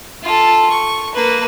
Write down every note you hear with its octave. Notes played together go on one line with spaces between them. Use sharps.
F4 A4
C#6
A#3 B4